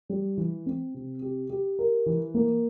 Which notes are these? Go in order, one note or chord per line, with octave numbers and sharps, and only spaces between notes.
G3
E3
C4
C3
G4
G4
A#4
E3
A#3